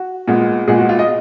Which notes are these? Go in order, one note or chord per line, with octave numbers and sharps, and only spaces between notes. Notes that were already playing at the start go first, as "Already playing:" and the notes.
Already playing: F#4
A#2 G#3 B3
A#2 G#3 B3 G#4
F#4
F4
D#5